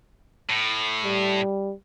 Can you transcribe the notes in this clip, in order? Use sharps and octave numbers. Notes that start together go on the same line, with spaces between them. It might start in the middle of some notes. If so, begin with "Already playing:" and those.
A2
G3